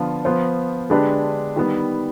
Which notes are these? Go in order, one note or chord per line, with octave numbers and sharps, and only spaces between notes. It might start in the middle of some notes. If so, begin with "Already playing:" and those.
Already playing: D3 F3 B3 F4
F3 B3 F4 C5
D3 G#3 D4 G4 B4
D#3 G3 B3